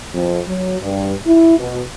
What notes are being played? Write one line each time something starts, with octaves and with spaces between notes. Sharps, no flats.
F2
F#3
G2
E4
B2